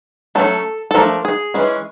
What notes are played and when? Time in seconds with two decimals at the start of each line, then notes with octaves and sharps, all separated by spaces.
0.35 F#3 A3 C#4 A4
0.91 A4
0.95 F3 A3 D4 A#4
1.25 G#4
1.54 E3 G#3 C#4